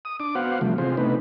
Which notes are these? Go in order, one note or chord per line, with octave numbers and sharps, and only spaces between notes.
D#6
D4 D6
B3 F#4 C5 F5 F#5
C3 E3 F3 G3 A3
C3 C4 F4 G#4 C5
C3 A3 B3 D4 D#4 B4